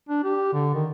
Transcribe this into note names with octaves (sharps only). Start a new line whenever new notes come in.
D4
G4
D3
D#3